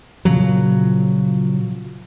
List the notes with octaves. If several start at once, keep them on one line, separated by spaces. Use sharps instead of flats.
A#2 C#3 F3 F#3